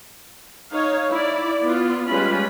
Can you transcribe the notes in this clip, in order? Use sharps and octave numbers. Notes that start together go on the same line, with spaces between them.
D#4 C#5 F5
E4 D5
B3 F4
G3 G#3 C#4 F4 B4 B5